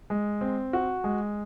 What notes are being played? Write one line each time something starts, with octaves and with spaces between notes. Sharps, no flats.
G#3
C4
F#4
G#3